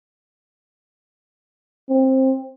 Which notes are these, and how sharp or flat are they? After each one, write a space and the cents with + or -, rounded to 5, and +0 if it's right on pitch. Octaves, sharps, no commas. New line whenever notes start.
C4 +15